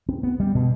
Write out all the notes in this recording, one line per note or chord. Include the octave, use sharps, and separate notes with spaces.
C4
B3
G3
B2